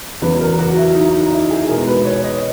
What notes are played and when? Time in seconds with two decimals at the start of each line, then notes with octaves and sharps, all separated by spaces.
0.22 E2 C#3 F#3 B4
0.41 A#4
0.59 F#4
0.77 E4
0.95 D#4
1.13 D#4
1.32 E4
1.51 G#4
1.68 B2 G#3 B3 A#4
1.87 B4
2.05 C#5
2.24 D#5